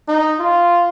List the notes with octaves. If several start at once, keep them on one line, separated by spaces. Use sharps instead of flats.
D#4
F4